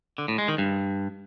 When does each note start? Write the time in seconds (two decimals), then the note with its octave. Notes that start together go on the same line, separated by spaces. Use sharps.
0.18 D3
0.28 A2
0.38 G#3
0.48 D#3
0.58 G2